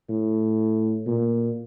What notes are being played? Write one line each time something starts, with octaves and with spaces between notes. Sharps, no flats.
A2
A#2